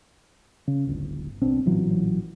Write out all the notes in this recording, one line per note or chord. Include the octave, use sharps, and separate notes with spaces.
C#3
D1 G1
D#1 B1 C4 D4
A1 A#2 E3 F#3